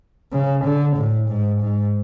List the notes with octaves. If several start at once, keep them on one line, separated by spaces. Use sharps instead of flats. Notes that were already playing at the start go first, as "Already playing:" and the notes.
C#3
D3
A2
G#2
G#2